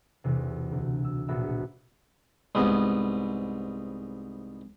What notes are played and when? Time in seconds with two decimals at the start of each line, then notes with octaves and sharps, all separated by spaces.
0.24 B1 E2 C3
0.72 D2
1.05 E6
1.28 A#1 B2 B3 F#4 E5 B5
2.55 C2 G#2 B3